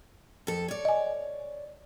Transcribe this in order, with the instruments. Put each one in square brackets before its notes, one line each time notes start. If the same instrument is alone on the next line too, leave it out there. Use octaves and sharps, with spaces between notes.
[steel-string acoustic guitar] F2 A4
C#5 D5
[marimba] D#5 G#5